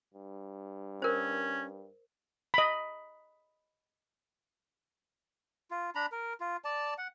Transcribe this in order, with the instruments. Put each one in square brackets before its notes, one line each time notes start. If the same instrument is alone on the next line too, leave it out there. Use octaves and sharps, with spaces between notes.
[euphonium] G2
[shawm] C#4 [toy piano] A#4 C5
[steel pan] D#5 B5
[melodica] F4
D4 A#5 B5
A#4
F4
D5 A5
F#5